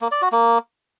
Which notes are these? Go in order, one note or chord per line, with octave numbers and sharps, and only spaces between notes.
A#3
D5
F#4
A#3